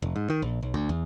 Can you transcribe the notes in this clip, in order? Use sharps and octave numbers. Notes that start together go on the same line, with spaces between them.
F1
G#2
D#3
A#1
B1
D2
E2